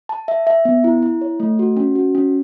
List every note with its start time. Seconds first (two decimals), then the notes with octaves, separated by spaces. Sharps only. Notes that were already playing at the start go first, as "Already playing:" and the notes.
0.09 A5
0.28 E5
0.47 E5
0.65 B3
0.84 E4
1.02 E4
1.21 C#5
1.40 A3
1.59 F#4
1.77 C#4
1.95 F#4
2.15 C#4